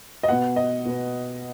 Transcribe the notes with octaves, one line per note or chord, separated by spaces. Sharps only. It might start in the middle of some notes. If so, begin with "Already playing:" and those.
D#5
B2 B3 F#5
D#5
B2 B3